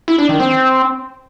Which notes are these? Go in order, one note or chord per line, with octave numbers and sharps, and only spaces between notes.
E4
D4
D#3
C4